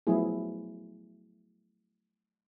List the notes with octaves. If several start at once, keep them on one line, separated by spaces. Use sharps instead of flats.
F3 F#3 A3 B3 E4 G#4